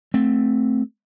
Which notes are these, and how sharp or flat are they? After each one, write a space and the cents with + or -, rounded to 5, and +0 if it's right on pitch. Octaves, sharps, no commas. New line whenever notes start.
A3 +0 C4 +0